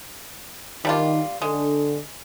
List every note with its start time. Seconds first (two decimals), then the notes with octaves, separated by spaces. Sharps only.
0.85 D#3 G3 D4 F4
1.42 D3 G#3